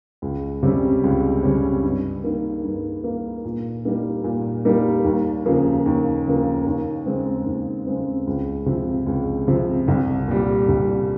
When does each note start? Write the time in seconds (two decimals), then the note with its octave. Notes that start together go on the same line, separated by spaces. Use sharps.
0.22 C#2
0.63 C3 G3 C#4
1.04 C#2
1.43 C3 G3 C#4
1.83 G2
2.24 D#3 A#3
2.64 G2
3.04 D#3 A#3
3.45 A#2
3.85 G3 A#3 D#4 A#4
4.24 A#2
4.65 G3 A#3 D#4 A#4
5.04 D#2
5.46 C#3 F3 A#3
5.86 D#2
6.26 C#3 F3 A#3
6.66 D#2
7.06 C#3 G#3 C4
7.46 D#2
7.86 C#3 G#3 C4
8.27 C#2
8.66 C3 F3
9.06 C#2
9.47 C3 F3
9.88 C2
10.28 A#2 G3
10.68 C2